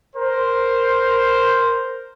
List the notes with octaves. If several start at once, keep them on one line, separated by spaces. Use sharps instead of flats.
A#4 C5